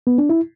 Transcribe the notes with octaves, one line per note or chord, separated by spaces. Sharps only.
B3
D4
E4